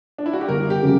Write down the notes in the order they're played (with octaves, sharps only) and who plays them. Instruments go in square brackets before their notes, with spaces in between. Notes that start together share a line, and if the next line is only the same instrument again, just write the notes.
[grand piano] D4
E4
F#4
G4
[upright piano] G1 [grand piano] A#4
[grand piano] G4
[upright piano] C#3 F#3